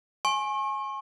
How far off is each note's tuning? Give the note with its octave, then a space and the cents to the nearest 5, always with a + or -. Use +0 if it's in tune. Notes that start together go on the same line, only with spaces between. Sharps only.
G#5 +15 C#6 -40